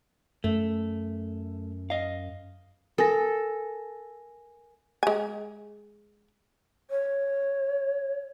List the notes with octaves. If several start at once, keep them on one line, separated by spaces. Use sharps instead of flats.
F#2 A3
D#5 F5
A4 A#4 G#5 A#6
G#3 G#5
C#5